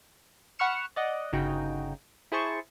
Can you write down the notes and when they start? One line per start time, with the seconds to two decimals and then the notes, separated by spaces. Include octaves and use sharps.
0.59 F#5 B5 C#6 F6 C#7 E7
0.96 D5 D#5 F#5
1.33 G1 C#3 D#4 F#4 G5
2.32 E4 G#4 C5 A5 C#6